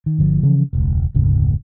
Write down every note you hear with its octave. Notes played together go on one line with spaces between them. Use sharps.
D#3
G1 D3 F3
C#3 E3 F3 C#4
E1 C#2
F1 D2 G#2 C#3